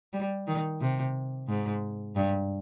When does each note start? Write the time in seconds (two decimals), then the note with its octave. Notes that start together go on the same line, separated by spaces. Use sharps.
0.13 G3
0.47 D#3
0.81 C3
1.48 G#2
2.16 G2